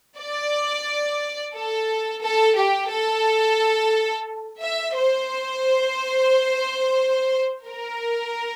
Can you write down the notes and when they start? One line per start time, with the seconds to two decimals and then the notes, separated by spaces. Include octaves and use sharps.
0.18 D5
1.54 A4
2.22 A4
2.57 G4
2.90 A4
4.61 E5
4.95 C5
7.67 A#4